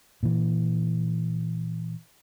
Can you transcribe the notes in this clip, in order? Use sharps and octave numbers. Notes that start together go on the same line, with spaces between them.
A#2 E3